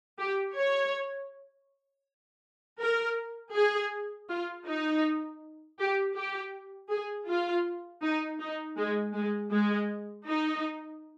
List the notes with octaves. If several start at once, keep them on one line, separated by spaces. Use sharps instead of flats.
G4
C#5
A#4
G#4
F4
D#4
G4
G4
G#4
F4
D#4
D#4
G#3
G#3
G#3
D#4